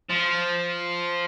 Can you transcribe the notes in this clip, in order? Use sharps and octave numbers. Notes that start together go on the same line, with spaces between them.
F3